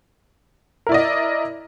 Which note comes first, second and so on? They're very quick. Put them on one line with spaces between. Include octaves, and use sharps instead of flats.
A#4 E4 D5 D#5